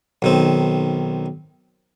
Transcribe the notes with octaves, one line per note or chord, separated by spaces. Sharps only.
B1 D#3 C4